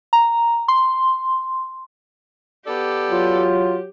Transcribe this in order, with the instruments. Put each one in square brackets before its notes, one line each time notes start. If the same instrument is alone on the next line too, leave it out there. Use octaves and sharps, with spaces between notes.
[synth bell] A#5
C6
[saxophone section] B3 A4 D5 [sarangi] G4
[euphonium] F#3 [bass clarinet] F4